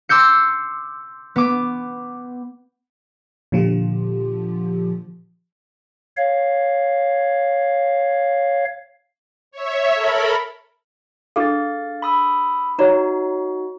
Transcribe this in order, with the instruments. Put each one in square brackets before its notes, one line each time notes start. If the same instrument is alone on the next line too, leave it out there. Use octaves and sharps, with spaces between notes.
[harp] C6 D6 E6 G6 C#7
B3 D6
[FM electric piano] A#2 D3 F3 F4 G4
[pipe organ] C#5 F5
[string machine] C#5 E5
A4 A#4 B5
[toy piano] D4 G#4 A4 [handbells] F5 A6
[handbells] B5 D#6 E6
[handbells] D#4 F#4 [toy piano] C#5 D5 A#5